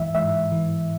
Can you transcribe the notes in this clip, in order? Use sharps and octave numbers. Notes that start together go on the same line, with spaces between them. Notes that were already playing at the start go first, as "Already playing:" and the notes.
Already playing: G#2 E3 E5
G#2 E5
E3